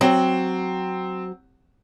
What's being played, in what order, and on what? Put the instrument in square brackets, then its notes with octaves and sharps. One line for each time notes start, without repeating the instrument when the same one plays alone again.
[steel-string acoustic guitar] F#3 [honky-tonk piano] C4